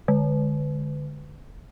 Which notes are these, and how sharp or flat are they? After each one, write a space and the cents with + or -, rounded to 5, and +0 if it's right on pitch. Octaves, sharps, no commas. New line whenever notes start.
D3 +0